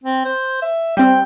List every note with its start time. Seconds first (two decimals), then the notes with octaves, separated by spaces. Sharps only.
0.04 C4
0.25 C5
0.62 E5
0.97 G3 C4 G5